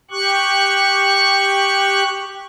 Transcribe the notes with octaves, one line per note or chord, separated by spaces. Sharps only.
G4 C#6 F#6